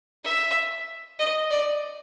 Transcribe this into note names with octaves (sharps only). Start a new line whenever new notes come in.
E5
D#5
D5